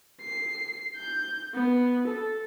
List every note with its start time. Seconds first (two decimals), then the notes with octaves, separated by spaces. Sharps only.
0.21 C7
0.96 G6
1.54 B3
2.07 A4